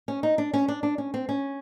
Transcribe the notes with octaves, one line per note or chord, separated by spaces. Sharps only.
C#4
D#4
D4
C#4
D4
D4
C#4
C4
C#4